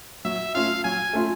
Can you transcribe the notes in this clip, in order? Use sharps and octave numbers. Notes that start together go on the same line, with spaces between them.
F#3 E5
A3 C#4 F4 F5
F#3 G#5
A3 C#4 F4